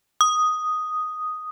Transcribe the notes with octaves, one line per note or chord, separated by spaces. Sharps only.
D#6